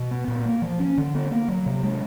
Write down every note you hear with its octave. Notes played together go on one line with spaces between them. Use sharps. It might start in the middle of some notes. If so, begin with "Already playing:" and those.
Already playing: B2
B3
A#2
A#3
F3
C#4
D3
B3
A#3
F#3
C3
G#3